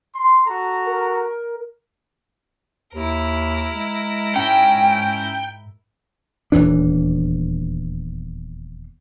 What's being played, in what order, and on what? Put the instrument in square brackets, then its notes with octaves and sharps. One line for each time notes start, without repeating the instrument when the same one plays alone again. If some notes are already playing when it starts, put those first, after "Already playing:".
[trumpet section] C6
F#4 A4 A#5
[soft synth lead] A#4
[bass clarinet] D#2 [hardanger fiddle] E4 A#4
[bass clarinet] G#3
[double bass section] G#2 [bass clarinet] C#4 [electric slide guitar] G5
[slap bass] D#1 E2 E3 D4